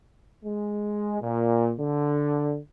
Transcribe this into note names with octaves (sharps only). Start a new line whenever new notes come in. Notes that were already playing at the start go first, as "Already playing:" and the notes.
G#3
A#2
D3